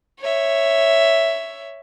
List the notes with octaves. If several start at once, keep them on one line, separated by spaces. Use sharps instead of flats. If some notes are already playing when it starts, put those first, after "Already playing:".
C#5 E5